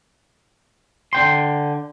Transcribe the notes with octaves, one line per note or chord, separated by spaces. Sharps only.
D3 G5 C6